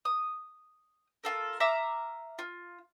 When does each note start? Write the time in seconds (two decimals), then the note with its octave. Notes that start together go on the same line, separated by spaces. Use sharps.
0.05 D#6
1.24 F4 A4 A#4
1.60 E5 F5 A#5 D6
2.39 F4